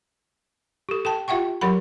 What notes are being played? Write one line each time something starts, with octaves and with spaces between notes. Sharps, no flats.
G4 A4
A4 G5 A5
F4 G4 E5 F#5 G5 C#6
F#3 G4 A#4 F#5 B5